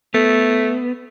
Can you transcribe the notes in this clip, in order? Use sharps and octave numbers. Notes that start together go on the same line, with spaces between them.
A3 B3